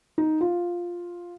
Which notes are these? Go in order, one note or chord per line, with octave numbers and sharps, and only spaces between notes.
D#4
F4